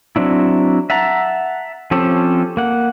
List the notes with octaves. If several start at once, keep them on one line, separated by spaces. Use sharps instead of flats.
F#3 C4 D4 E4
E5 F#5 A5 A#5
F3 C4 C#4 G4 A4
A#3 F#5